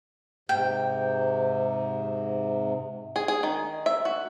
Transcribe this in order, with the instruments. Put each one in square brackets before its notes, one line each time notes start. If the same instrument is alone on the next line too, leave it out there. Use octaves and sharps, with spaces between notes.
[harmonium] G#2 C3 [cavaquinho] G5
[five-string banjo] G#4
G#4
D#3
E5
F#4